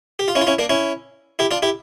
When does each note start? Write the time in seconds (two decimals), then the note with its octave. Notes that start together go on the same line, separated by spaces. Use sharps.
0.19 G4
0.28 F4
0.35 C#4 E4
0.41 F4
0.47 C#4 E4
0.59 A#3 D4
0.70 C#4 E4
1.39 E4 G4
1.51 D4 F4
1.62 E4 G4